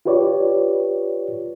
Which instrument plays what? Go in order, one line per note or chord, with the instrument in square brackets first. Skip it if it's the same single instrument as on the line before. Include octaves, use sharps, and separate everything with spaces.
[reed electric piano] F4 G4 B4 C#5 D5